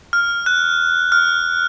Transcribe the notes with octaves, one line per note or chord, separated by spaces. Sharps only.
F6
F#6
F6